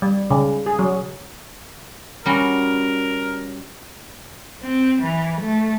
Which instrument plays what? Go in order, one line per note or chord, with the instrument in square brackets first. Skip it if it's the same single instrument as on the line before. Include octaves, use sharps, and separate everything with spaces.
[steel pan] G3
C#3
G#4
F#3
[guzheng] G3 C#4 F#4 [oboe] A#4
[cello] C4
E3
A3